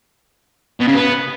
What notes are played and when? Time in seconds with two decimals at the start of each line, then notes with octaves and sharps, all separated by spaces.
0.80 B2
0.87 C#3
0.95 B3